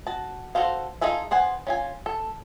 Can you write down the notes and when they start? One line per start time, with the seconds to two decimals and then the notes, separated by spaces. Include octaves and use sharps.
0.07 F#4 A5
0.55 F#4 G#4 A4 C5 F5
1.01 D#4 F4 G#4 A4 E5
1.31 B3 C5 F#5 G#5
1.67 C#4 F4 G#5
2.06 A4